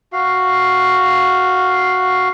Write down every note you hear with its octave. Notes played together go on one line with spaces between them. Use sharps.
F#4 F5